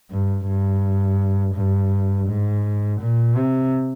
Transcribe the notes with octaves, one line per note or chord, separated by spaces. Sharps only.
G2
G2
G2
G#2
A#2
C3